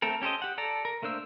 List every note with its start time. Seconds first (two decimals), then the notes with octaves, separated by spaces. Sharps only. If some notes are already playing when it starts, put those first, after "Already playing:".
0.02 A3 C4 A4 A#4
0.22 C#4 G4 A4 C5 D#5
0.42 G4 F#5
0.58 A4 D5 A#5
0.85 A#4
1.02 A3 A#3 D4 C5 E6